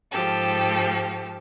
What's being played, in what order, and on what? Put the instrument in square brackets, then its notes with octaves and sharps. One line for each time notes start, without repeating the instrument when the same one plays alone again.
[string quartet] G#2 F3 G4 A4